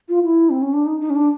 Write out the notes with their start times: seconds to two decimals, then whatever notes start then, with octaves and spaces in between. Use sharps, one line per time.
0.09 F4
0.24 E4
0.50 C4
0.62 C#4
0.74 D4
0.86 D#4
1.01 D#4
1.10 C#4
1.16 D4